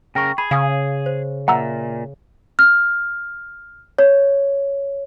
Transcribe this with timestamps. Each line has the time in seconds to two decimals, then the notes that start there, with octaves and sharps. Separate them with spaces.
0.15 C#3 A#4 G5 C#6
0.38 G#4 B5
0.51 C#3 F5 G#5 D#6
1.06 C5
1.48 A#2 E5 F#5 A#5 E6
2.59 F6
3.99 C#5